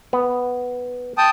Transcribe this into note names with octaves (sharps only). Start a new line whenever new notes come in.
B3
G5 A5 D#6